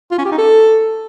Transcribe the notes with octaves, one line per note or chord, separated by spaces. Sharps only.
F4
C#4
G4
D#4
A4